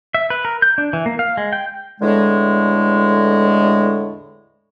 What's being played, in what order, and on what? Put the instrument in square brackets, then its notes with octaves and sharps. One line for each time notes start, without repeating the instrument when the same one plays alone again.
[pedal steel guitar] E5
B4
A#4
G6
D4
E3
A#3
F5
G#3
G5
[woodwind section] E2 A2 D3 G#3